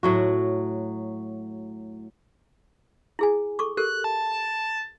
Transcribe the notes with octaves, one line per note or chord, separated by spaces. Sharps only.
A2 F#3 F#4
E4 G#4 G#5
A4 C#6 D6
G4 A4 A#4 F#6
A5